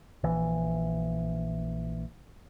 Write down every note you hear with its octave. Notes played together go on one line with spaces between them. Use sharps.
A#1 E3